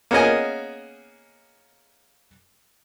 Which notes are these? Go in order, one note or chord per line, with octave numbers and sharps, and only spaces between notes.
A#3 B3 C#4 G#4 D#5 G#5